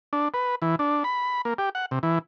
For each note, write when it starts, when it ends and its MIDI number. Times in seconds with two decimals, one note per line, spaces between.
0.13 0.28 62
0.34 0.55 71
0.62 0.76 52
0.79 1.03 62
1.04 1.41 83
1.45 1.54 58
1.58 1.69 67
1.75 1.86 78
1.91 1.99 48
2.03 2.19 52